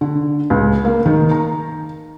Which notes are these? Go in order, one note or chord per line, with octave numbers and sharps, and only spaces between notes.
D3
C#2
A#3
D#3
A#5